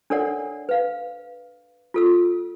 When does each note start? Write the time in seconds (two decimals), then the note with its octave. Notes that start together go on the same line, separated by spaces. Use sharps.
0.10 D4 A4 A#4 C#5 D5 F#5
0.69 B4 F5
1.94 F4 A4 E6